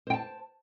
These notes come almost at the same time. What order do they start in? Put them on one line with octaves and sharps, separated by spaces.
C5 G5 A5